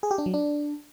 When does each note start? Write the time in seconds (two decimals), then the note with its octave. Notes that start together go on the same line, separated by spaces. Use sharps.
0.03 G#4
0.11 G4
0.18 D4
0.26 F#3
0.34 D4